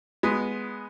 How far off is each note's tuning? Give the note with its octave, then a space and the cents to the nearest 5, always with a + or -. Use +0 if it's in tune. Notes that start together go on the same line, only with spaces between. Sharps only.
G#3 +0 B3 +0